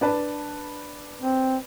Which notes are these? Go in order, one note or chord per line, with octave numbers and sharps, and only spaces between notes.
D4 B4 A5
C4